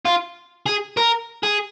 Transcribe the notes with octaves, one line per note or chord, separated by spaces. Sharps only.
F4
G#4
A#4
G#4